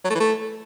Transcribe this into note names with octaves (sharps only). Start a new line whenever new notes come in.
F#3
A3
E3
A3